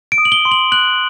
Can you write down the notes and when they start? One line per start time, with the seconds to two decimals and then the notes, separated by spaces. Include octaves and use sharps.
0.12 D7
0.18 D#6
0.25 F#7
0.32 G7
0.45 C6
0.51 F#7
0.72 F#6 F#7